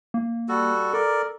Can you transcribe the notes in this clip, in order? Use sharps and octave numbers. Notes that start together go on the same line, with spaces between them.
A#3
G3 F#4 A4
A4 A#4 D5